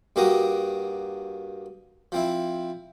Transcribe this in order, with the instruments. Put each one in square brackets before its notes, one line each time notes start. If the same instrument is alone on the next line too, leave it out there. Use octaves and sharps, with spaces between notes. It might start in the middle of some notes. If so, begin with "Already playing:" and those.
[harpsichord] G2 A#3 F#4 G4 A#5 D#6
F3 C4 E4